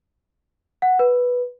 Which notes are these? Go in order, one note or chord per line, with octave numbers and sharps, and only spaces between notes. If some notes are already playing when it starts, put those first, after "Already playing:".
F#5
B4